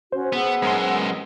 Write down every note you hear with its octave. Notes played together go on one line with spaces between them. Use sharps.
C#4 F#4 C5
B3 G#4 F#5 E6
F#2 G#3 B3 A#4 C6